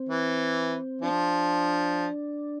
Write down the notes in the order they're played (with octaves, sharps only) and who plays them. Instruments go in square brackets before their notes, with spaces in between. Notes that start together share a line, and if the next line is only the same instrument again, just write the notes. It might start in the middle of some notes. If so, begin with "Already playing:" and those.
Already playing: [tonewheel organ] C4
[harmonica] E3
[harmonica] F3 [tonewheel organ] D4